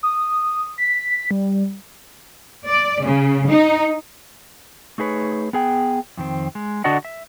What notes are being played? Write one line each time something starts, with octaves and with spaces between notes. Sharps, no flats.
D#6
B6
G3
D5
C#3
D#4
A3 D#4 G#4 B4 C#5
B3 G#4 G5
F2 D#3 C4
G#3
D3 D4 F#4 D5 D#5 F#5
E5